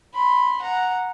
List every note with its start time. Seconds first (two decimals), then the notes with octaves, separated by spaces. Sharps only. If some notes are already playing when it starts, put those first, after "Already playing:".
0.14 B5 C6
0.62 F#5 A#5